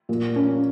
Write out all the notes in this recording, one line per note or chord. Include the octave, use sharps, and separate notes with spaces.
A#2
A#3 C#4